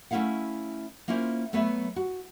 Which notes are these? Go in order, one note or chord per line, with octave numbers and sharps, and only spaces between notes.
A3 C#4 D#4 E4 F5 F#5
A#3 C#4 E4 F4 C5
F#3 A3 B3 B4 C#5 E5
F#4